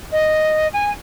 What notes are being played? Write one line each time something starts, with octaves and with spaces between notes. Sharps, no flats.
D#5
G#5